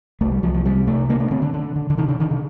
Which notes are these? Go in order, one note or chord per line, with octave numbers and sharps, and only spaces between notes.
C2 A3
G3
C2 F3
F3
C3 G3
C3 A3
D3 A#3
A3
D3 C4
D3
D3
D3
D3
C3 D#3
D3
C3 D#3
D3